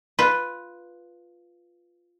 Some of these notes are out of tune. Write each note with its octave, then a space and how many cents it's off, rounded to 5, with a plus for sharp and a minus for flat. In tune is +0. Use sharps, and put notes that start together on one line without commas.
F4 +0 B4 +0